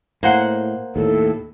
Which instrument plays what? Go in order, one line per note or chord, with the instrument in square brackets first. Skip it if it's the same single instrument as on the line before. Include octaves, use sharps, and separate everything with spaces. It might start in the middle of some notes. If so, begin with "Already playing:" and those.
[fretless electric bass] A2 [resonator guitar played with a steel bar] A#3 C5 F#5
[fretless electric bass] D#2 A2 [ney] A4